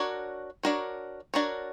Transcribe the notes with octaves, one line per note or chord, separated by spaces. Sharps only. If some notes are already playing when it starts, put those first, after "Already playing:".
Already playing: D4 F#4 A#4 C#5
D4 F#4 A#4 C#5
D4 F#4 A#4 C#5